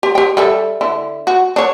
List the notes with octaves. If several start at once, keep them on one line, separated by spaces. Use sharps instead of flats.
G4
G4 G5
G3 A4 E5
D3 E4
F#4
D4 C#5